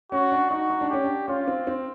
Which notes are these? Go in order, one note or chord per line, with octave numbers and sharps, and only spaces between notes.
C#4 F#4
D4
D#4 F#4
D#4
D4
C#4 G4
D4
C#4 F4
C4
C4